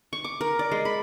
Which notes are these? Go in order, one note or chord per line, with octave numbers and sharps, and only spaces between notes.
C#6
D6
A#4
D5
G#3
B5